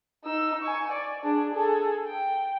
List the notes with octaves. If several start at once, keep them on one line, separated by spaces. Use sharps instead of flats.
D#4 E6
G#5 C#6
D5
D4 G#4
G#4 A4
G5